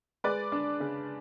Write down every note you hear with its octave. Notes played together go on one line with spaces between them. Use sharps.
G#3 B4 D5
D4
C#3